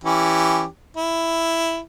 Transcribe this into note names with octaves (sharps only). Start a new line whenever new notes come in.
E3 C#4 G4
E4